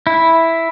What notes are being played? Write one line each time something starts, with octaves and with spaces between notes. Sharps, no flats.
E4